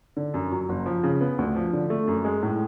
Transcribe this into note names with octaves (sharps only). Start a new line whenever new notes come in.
D3
F#2
F#3
F#1
F3
C#3
B3
D2
F3
D3
A3
F#2
G#3
A2